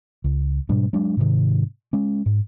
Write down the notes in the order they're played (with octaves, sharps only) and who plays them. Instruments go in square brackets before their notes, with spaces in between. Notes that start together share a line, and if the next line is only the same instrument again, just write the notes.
[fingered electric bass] C#2
G#2 B2 G3 D4
F#3 G#3 D4
G#2 C3 D#3
G#3 C#4
G#2